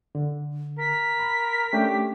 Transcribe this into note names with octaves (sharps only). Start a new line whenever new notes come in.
D3
A#4 B6
B5
A3 C#4 D4 G4